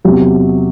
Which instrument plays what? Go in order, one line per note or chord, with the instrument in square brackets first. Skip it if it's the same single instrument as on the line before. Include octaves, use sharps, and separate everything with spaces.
[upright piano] E2 C3 F#3 G4